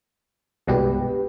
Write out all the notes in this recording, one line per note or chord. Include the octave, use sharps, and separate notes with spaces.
C2 G2 B2 G#3 G4 B4